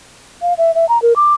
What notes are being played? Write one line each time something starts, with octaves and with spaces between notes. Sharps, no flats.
F5
E5
E5
A#5
A#4
D6